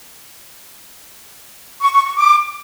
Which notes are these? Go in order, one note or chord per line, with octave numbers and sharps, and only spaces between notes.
C#6
C#6
C#6
D6